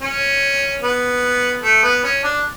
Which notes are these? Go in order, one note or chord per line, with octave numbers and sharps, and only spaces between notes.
C#4
B3
A3
B3
C#4
D4